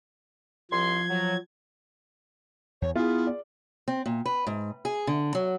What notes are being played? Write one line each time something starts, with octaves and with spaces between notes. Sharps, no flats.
C2 F3 C6 G#6
F#3
E2 C#5
B3 E4 F4 G#4
D5
C4
A#2
B4
G#2
G#4
D3
F#3